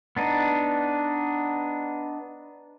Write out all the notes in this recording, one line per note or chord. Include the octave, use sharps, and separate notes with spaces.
B3 D4 D#4